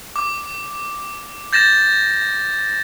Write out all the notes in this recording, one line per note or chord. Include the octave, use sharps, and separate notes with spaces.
D6
G6 A6 A#6 E7